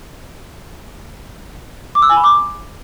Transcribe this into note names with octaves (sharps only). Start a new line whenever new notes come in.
D6
E6
G#5
B5
D6